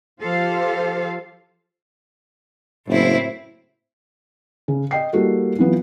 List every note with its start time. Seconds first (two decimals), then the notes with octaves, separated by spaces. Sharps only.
0.20 F3 F4 G4 A4 C5 F5
2.88 F#1 A2 C4 E4
4.68 C#3
4.91 D#5 G5 C7
5.13 G3 A#3 E4 F#4 A4
5.59 E3 F#3 B3 F4